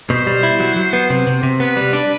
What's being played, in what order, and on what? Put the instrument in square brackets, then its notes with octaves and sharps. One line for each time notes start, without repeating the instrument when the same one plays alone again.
[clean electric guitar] B2 [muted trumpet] C5
[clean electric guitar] G3
E4
F#3
F#3
B3
C3
C3
C3
[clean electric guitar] B3 [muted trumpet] B4
[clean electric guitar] G3
D4